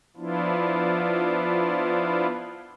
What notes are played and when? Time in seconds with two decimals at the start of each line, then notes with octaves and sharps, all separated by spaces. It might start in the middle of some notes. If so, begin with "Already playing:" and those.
0.17 F3 B3 D4 E4 F4